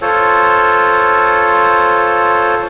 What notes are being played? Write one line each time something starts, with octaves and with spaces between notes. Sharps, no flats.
F4 A4 C5 C#5